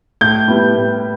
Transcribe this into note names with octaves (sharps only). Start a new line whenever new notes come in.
A2 G6
G3 B3 E4
A2